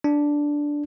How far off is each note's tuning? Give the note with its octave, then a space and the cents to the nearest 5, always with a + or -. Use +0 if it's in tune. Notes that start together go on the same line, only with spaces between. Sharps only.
D4 -5